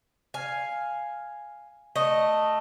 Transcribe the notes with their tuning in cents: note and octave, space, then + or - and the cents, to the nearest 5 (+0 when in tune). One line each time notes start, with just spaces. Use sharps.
F5 +0 G#5 +0
A3 +0 D#5 -5